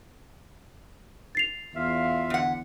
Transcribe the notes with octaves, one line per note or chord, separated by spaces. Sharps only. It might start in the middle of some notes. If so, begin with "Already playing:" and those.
A6 C7 F7
E2 F4 E5 F5
D3 F#5